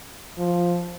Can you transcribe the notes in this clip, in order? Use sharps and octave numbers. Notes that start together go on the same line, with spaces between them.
F3